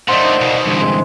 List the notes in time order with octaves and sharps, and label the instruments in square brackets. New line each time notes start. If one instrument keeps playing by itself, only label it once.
[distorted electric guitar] D3 A3 [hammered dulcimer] C5 [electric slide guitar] D5 D#5 F#5
[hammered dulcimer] D#4
[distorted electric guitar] C2 B2
[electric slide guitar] D3 E3 G3
[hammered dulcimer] C3 G#3